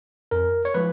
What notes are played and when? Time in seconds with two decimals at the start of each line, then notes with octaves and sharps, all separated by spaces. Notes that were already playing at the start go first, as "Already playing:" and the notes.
0.31 F2 A#4
0.65 C#5
0.74 F3 G#3 B4